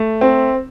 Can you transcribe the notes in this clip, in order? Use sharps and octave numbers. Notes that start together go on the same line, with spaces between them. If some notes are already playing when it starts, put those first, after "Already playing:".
Already playing: A3
C4